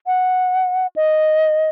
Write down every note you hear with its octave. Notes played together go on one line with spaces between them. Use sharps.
F#5
D#5